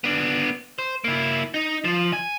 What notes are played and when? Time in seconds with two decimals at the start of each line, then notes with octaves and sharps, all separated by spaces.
0.04 B3 D4
0.79 C5
1.04 A#3 E4
1.54 D#4
1.84 F3
2.13 G#5